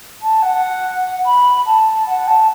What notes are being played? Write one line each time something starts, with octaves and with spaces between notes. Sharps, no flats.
A5
F#5
B5
A5
F#5
A5